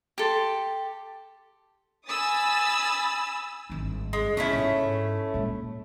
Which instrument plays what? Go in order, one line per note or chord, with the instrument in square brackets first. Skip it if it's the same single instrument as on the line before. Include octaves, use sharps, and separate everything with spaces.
[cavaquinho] G4 A4 C6
[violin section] G#5 B5 D#6 E6 A6
[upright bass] G#1 G2
[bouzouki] G#3
[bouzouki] A3 C#4 E4 [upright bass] B3
[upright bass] G#2
A#2 G#3